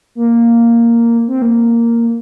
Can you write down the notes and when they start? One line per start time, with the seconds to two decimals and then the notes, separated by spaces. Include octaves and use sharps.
0.15 A#3
1.28 C4
1.42 A#3